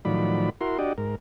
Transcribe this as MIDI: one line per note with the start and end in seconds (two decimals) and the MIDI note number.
0.05 0.50 45
0.05 0.50 51
0.05 0.50 53
0.05 0.50 54
0.05 0.50 74
0.05 0.50 83
0.61 0.78 64
0.61 0.78 66
0.61 0.78 70
0.61 0.78 84
0.78 0.93 62
0.78 0.93 66
0.78 0.93 67
0.78 0.93 74
0.78 0.93 75
0.98 1.15 44
0.98 1.15 70